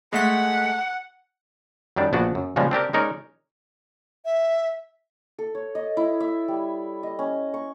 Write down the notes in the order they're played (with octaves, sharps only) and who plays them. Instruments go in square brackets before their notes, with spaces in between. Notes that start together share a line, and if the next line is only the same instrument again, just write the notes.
[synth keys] G#3 A3 B6 [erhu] F#5
[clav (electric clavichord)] F#2 D#3 G3 D4
A#1 B3 D4 F#4
F#2
A#2 C#3 F3 G3 G#3
C4 D4 G4 A#4
G#3 C#4 D#4 A#4 C#5 D5
[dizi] E5
[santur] A4
C#5
D#5
E4
E5
G3
D#5
C#4
C#6